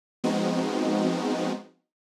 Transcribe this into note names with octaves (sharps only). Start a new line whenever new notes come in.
F3 G#3 B3 C4 D#4 F#4